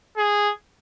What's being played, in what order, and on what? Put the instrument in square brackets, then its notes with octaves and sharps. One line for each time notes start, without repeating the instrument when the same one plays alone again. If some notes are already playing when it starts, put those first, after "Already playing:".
[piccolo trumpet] G#4